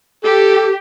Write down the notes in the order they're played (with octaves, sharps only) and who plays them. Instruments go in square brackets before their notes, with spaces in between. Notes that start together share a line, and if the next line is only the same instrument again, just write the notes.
[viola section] G4 [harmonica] A4